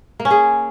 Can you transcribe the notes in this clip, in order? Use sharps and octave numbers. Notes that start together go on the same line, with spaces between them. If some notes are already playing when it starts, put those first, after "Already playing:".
A#3
C#4
G#4